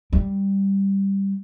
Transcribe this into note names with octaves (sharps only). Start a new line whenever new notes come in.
G3